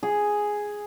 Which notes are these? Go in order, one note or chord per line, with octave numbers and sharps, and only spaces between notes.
G#4